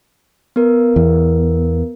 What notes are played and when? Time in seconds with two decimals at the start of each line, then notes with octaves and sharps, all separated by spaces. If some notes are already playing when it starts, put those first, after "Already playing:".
0.56 B3 A#4
0.96 E2